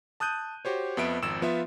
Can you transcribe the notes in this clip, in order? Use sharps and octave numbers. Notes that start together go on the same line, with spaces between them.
A5 D#6 F#6 G6 D#7
F#4 G4 C5 C#5
F2 B3 E5 D7
G#1 F2 E6 E7
F3 B3 F4 E5